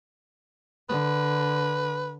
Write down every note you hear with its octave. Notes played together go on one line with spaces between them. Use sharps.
D3 B4